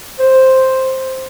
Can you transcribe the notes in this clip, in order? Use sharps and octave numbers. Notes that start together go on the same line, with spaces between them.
C5